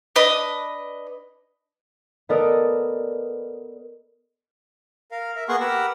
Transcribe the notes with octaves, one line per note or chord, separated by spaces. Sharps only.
D4 B4 D#5
B3 A4 A#4 D5 D#5 D#6
A#4 F5
A#4 E5
A#3 B3 G#4 F#5 C6 C#6
G4 A#4 B4 F#5 E6